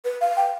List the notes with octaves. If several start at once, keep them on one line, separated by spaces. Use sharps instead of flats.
B4
F5
G5